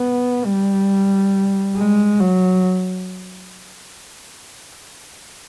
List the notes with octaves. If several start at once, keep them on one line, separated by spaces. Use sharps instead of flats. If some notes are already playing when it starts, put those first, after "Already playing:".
Already playing: B3
G3
G#3
F#3